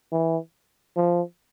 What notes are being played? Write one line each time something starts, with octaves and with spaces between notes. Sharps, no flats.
E3
F3